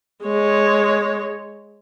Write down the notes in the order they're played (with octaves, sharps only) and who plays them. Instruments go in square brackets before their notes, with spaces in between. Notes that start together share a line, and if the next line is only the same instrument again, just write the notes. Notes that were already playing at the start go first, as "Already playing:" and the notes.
[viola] G#3 C#5